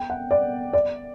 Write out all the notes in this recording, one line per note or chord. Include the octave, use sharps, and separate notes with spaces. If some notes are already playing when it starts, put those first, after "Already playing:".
Already playing: G5
F#5
D5
D5